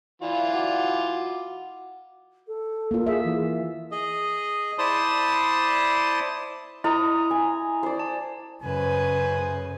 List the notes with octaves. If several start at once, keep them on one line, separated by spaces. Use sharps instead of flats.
E3 F4 D5 E5 F5
F#4 F#5 D6
A4
A#3 F4
G#4 E5
E3
G#4 D#5
E4 C5 D5 A5 C6 D#6
E4 D#5 A#5 D#6
G#5
C5 D5
A5
F#2 C#3 B4 C5 G#5